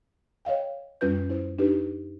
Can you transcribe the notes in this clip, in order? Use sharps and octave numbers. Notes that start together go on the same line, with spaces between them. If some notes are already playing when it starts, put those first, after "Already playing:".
C#5 D#5 F5 G5
F#2 G3 C#4 F4 B4 G6
E4 C5
D4 D#4 G4 B4